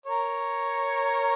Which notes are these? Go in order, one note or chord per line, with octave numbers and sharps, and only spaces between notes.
A#4 C#5